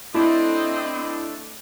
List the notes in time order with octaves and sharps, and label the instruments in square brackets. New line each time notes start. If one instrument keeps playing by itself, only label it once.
[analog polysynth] A3 D4 [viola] C4 D#5 [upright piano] E4